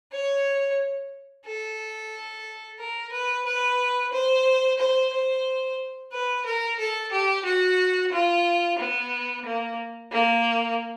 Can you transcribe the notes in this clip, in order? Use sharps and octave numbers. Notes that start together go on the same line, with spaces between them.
C#5
A4
A#4
B4
B4
C5
C5
C5
B4
A#4
A4
G4
F#4
F4
B3
A#3
A#3